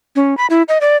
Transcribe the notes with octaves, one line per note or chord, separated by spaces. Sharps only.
C#4
B5
E4
D#5
D5